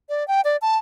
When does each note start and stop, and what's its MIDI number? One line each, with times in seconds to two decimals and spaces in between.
0.09 0.26 74
0.28 0.41 79
0.44 0.57 74
0.62 0.77 81